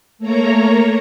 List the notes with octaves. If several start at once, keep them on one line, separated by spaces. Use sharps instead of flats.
A3 A#3 C#5 A#5